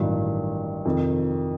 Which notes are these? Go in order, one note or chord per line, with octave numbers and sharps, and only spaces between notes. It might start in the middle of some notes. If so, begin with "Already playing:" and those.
Already playing: A1 G2 D#3 F#3
F2 C3 D#3